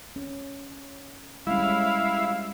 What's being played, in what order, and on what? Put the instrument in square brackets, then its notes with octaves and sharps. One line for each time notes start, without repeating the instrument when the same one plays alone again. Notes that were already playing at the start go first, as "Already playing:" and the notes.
[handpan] C#4
[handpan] G3 G#3 C#4 [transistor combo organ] E4 [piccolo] F5